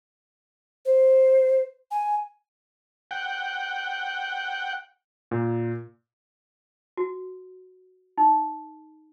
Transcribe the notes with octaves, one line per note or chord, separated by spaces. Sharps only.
C5
G#5
F#5 G5
A#2
F#4
D#4